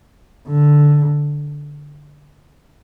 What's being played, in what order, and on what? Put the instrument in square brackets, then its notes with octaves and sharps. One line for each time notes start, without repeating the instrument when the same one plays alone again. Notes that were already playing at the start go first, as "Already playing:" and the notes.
[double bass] D3